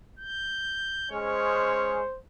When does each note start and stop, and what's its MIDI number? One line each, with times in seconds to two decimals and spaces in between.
0.19 1.11 91
1.12 2.02 56
1.12 2.02 61
1.12 2.16 72
1.12 2.10 73